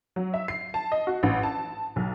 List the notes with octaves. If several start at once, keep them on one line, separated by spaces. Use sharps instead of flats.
F#3
E5
C7
A5
D#5
F#4
A1
A5
B1